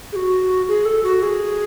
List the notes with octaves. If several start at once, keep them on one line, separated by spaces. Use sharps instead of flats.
G#4
F#4
G#4
A4
F#4
G#4